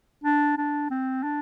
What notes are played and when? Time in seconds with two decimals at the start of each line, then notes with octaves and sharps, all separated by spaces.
0.24 D4
0.57 D4
0.91 C4
1.23 D4